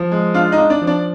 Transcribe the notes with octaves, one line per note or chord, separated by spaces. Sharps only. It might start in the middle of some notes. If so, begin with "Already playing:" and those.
Already playing: F3
G#3
D4 F4 F5
D#4 D#5
D4
D4 D5
F3
D4 D5